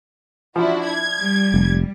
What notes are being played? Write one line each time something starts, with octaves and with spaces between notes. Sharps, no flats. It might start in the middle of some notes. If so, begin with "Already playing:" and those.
F3 D4 E4 F#4
G#6
G3
F1